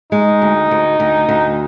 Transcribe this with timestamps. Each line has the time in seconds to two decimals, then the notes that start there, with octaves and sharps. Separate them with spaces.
0.12 G#3 D#4
0.42 D2
0.71 D2
1.00 D2
1.29 D2